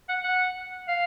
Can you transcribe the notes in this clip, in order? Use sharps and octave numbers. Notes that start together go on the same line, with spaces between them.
F#5
F#5
F5